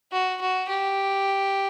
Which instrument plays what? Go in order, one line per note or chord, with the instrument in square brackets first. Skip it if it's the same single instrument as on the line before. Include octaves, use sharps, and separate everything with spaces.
[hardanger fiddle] F#4
F#4
G4